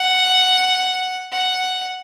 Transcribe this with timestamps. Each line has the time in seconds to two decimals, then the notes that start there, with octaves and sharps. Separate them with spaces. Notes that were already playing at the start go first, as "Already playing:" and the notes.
Already playing: F#5
1.32 F#5